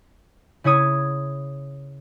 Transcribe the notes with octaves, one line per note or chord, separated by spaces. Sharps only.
C#3 E4 C#5 D#6 G#6